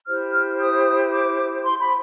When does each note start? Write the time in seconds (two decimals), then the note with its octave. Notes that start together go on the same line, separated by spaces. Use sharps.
0.08 E4 G4 C5 F6
0.59 D#6
1.11 D6
1.63 C6
1.80 B5